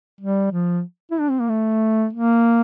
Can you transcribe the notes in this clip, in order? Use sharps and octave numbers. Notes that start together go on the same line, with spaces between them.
G3
F3
E4
D4
C4
A#3
A3
A#3